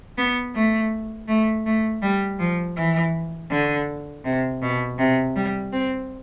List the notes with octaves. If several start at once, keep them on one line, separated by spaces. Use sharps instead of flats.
B3
A3
A3
A3
G3
F3
E3
D3
C3
B2
C3
G3
C4